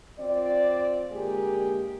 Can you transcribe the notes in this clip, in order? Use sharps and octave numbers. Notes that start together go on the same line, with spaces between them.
C4 F4 D5
D3 G#3 A#3 G4 G#4